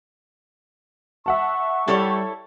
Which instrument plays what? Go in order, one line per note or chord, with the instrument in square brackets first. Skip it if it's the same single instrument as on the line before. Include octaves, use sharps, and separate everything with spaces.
[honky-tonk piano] E5 F#5 A5 [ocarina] C#6
[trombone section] G3 [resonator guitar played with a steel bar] E4 A4 C#5